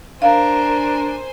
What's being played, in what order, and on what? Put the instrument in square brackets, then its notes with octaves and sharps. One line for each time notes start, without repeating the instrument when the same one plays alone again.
[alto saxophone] D4 [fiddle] A#4 [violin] C5 G#5 [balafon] F5